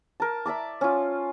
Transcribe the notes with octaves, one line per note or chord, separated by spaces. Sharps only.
A#4 A5
D5 E5 A5 D6
C#4 F4